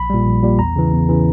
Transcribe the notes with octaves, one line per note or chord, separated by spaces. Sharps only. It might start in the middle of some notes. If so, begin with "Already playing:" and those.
Already playing: A#1 B5
A#2 G3
A#1
A#2 G3
E2 A#5
C#3 E3
E2
C#3 E3